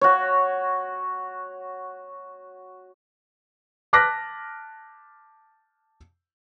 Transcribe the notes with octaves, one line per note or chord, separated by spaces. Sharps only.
F#4 C#5
A5 D6 F6 F#6 A#6 B6